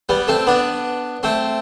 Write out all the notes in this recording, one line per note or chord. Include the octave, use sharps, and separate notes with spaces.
G3 B3
A3 C4
B3 D4
A3 C4